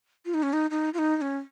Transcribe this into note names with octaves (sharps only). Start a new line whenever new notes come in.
F4
D#4
C#4
D#4
D#4
F4
D#4
D#4
C#4